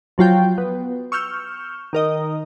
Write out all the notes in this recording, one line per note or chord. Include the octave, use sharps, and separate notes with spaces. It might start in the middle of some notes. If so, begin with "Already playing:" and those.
F3 F#3 F4 G5
B3
C#6 E6 F6 G6
D#3 A#4 D#5